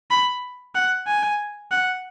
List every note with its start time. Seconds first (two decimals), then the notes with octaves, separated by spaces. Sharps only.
0.11 B5
0.75 F#5
1.07 G#5
1.71 F#5